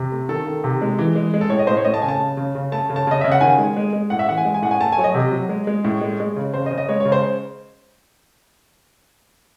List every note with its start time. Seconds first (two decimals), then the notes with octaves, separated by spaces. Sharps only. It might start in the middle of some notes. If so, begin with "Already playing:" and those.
Already playing: C3
0.12 A3
0.29 D#3 A4
0.47 D#3
0.64 C3
0.81 G#3
0.99 E3
1.16 G#3
1.34 G#3
1.41 A4
1.50 A2 C#5
1.59 D#5
1.67 A2 C5
1.77 C#5
1.84 A2 D#5
1.94 A5
2.02 C#3 G#5
2.08 A5
2.20 C#3
2.37 C#3
2.55 C#3
2.72 A3 A5
2.90 C#3
2.96 A5
3.07 C#3 D#5
3.21 C#3 E5
3.32 F#5
3.41 D#3 G#5
3.58 G#3
3.76 G#3
3.93 G#3
4.10 A2 F#5
4.19 E5
4.28 E3 F#5
4.37 G#5
4.45 G#3
4.54 G#5
4.62 A2 F#5
4.71 G#5
4.80 A3 A5
4.92 G#5
4.98 F#3 C#5
5.04 D#5
5.14 C3
5.32 F#3
5.49 G#3
5.67 G#3
5.84 A2
6.01 G#3
6.20 G#3
6.36 C#3
6.54 C#3 C5
6.66 D#5
6.71 C#3
6.78 D#5
6.89 G#3 C#5
7.00 C#5
7.05 C#3
7.12 C5